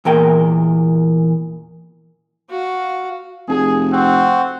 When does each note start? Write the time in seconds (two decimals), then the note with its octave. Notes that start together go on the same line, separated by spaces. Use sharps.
0.05 E2 A#2 A#4 G5
2.49 F#4 F5
3.48 F1 G#4
3.93 C4 F#4 F#5